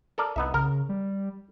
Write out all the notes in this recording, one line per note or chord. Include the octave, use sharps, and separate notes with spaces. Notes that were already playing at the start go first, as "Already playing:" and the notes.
A4 A#4 D5
C2 B3 D#4 E5
C#3 A#4
G3